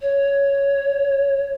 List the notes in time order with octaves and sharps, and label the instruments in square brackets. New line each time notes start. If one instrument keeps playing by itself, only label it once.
[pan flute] C#5